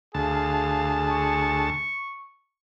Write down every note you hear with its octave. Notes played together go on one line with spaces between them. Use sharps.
D2 G#4 F5 A5
C#6